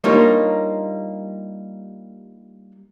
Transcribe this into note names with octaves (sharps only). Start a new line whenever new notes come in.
G3 A#3 D4 D#4 F4 C#5